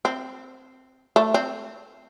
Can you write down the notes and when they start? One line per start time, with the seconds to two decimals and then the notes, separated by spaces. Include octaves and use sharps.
0.05 C4
1.16 A3
1.34 C4